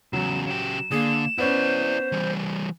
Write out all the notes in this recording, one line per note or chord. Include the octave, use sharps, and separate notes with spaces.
E2 C#3 F#3 E7
C#3 G4 E7
D3 A#3 G#4
B3 C#4 E4 C5 D5
E3 G3